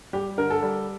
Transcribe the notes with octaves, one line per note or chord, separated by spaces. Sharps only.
G3 G4
D3 A#4
A4
G3